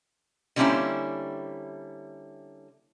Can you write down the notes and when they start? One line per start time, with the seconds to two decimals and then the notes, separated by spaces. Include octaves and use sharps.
0.56 D3 G3 A#3 C4 C#4 E4